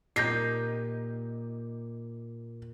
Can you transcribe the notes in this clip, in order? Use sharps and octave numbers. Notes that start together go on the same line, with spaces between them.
A#2 D#4 G4 G6 A#6 C7